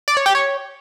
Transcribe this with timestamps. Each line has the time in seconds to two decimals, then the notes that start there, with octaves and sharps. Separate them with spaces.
0.08 D5
0.17 C#5
0.26 G4
0.35 C#5